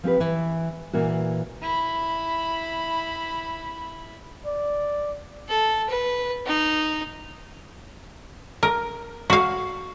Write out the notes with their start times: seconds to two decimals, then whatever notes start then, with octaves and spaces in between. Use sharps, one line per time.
0.03 F3 C4 G4 B4
0.20 E3
0.93 A#2 E3 A#3 F#4
1.62 E4 B5
4.46 D5
5.49 A4
5.90 B4
6.46 D#4
8.63 A#4
9.30 F#4 F5